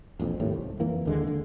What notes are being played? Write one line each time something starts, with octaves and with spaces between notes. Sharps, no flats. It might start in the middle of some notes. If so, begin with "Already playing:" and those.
E1 A#1 F2
G#1 D#2 A2
C2
F2 E3 A#3
D#2 D3 G#3
D3